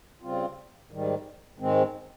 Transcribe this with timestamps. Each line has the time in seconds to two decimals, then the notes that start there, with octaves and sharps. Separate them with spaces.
0.22 C#3 G3 C4 F4
0.91 G#2 D#3 G3
1.58 G#2 D#3 G#3 C4